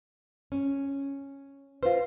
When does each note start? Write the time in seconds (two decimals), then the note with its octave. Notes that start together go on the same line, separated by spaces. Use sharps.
0.52 C#4
1.83 F4 B4 C5 F5